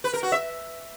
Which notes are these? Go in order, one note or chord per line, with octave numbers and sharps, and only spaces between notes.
B4
A#4
F#4
E5